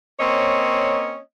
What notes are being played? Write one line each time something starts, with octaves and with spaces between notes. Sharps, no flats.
A#3 C4 C#4 C#5 D#5